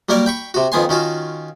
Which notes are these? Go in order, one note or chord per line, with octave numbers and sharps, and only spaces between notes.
F#3 G3 A#3 A#4 C#5 D5
G5 B5 C#6
C3 F#4
F2 D#3 B3 G#5 C6
D#3 C#4 F4 F#4